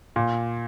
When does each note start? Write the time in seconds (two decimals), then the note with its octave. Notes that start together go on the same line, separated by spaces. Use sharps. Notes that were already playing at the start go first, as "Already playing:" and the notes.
0.16 A#2